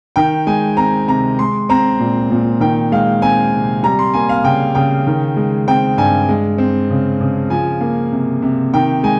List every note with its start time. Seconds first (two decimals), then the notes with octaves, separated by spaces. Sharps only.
0.16 D#3 G5
0.47 G#3 G#5
0.77 C4 A#5
1.08 C3 A#5
1.39 G#3 C6
1.69 C4 A#5
2.00 A#2
2.31 A#2
2.60 D#3 G5
2.92 G#3 F5
3.22 C4 G#5
3.53 C3
3.83 G3 A#5
3.99 C6
4.14 A#3 G#5
4.29 F5
4.44 C#3 G5
4.75 C#3 G5
5.07 D#3
5.37 G#3
5.68 C4 G5
5.97 G2 G#5
6.29 G#3
6.58 C4
6.90 C#3
7.21 C#3
7.50 F3 G#5
7.81 A#3
8.12 C3
8.42 C3
8.74 D#3 G5
9.03 G#3 G#5